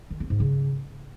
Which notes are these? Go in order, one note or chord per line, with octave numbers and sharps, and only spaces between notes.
D#3
C4
G#2
C#3